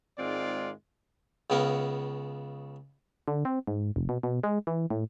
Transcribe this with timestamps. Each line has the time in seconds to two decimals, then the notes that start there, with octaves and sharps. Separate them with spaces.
0.19 G#2 D#3 G#3 C4 F4 D5
1.50 C#2 C#3 B3 A#4
3.28 D3
3.45 C4
3.67 G#2
3.96 F1
4.09 B2
4.23 B2
4.44 G#3
4.67 E3
4.90 A2